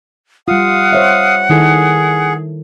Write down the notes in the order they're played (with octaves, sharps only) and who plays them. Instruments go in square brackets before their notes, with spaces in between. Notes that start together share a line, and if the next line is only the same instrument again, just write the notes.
[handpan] G3 F4 [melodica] F5 D#6 [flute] F#5
[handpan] C5 C#5 E5
[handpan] D#3 E4 A4 [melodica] G#4